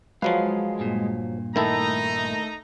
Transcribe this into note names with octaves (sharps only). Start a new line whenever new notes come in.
F3 F#3 G#3 B4 F5
G2 A#2
D#3 A3 D#4 E4 A4 A#5